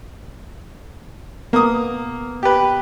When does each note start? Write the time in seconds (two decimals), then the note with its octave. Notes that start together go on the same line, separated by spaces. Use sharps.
1.53 A#3 B3 D#6
2.43 G4 B4